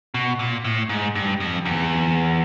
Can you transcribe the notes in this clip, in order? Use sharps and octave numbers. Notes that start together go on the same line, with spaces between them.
B2
A#2
A2
G#2
G2
F2
E2